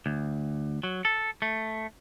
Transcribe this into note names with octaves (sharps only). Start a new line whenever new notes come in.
D2
F#3
A4
A3